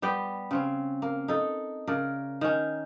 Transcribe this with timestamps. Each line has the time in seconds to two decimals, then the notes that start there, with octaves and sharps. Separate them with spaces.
0.02 G3 B3 G4 G5
0.51 C#3 C4 C#4
1.02 A#3
1.28 D#4 A4
1.87 C#3 A#4 D5
2.41 D#3 C#4